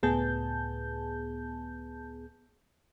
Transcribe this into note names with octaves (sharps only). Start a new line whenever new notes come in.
C#2 A2 B3 G#4 A5 G6